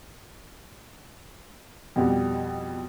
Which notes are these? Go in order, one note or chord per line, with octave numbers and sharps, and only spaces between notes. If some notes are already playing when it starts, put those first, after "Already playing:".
F2 B2 G3